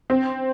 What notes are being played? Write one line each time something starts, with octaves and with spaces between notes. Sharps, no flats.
C4